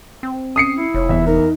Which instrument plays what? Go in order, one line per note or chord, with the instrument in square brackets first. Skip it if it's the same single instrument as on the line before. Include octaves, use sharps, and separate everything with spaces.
[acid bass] C4
[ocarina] C#4 [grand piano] D#6 C7 C#7
[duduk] E4
[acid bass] F1 [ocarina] C#5
[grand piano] E2 E5
[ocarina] D#4 [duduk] A#4